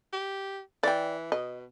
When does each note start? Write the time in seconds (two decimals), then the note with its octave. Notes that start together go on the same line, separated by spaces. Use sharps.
0.13 G4
0.83 E3 D5 G5
1.32 B2 D#5